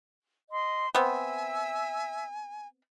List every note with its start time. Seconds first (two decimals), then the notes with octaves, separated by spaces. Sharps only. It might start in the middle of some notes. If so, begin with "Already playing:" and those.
0.50 D#5 C6
0.95 B3 C4 E5 G#5 E6